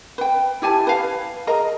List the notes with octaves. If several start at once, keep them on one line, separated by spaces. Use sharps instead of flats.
B4 G5
E4 G4 G#5 A5
B4 F5
G#4 A#4 D#5 A#5